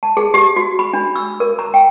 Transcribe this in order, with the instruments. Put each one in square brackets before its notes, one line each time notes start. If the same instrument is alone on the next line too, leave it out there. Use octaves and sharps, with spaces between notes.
[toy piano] A5
G#4
G4
F#4
B5
D4
E6
A#4
A#5
G5